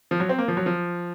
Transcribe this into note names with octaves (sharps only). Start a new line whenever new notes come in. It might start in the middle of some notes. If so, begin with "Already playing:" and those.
F3
F#3
C4
A#3
F3
F#3
F3